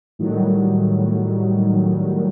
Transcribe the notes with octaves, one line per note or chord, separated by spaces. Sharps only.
A2 D#3 F#3 G3